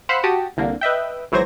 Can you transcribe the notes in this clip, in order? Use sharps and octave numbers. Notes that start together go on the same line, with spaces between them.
C5 F5 F#5 B5 E6 F#6
F#4 G4 A5 D#6
C2 D3 A#3
B4 D#5 E5 G5
G#1 E3 F#3 C5 G#6 A#6